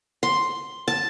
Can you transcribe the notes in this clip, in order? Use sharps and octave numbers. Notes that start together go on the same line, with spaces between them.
C6
A5